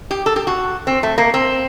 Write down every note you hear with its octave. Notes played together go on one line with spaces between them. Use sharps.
G4
A4
G4
F#4
C4
A3
A#3
C4